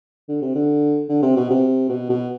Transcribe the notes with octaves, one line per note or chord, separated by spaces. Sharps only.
D3
C3
D3
D3
C3
B2
C3
B2
B2